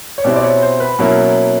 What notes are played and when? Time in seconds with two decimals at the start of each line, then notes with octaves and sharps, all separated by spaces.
0.18 C#5
0.24 B2 G3 C4 E4 D5
0.36 D5
0.43 C#5
0.62 C5
0.80 B4
0.99 B2 F#3 A#3 C#4 E4